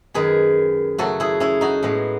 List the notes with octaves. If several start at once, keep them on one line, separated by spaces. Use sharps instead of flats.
F#2 D#3 G#3 G#4 B4
C#3 F#3 A3 F#4 A4
E4 G#4
C#4 E4
D#4 F#4
A2 G#3 B3